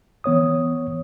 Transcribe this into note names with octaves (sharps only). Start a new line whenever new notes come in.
E3 B3 C#5 D#6